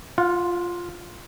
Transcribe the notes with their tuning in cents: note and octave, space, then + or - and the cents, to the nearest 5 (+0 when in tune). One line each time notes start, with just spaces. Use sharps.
F4 +0 F#5 -40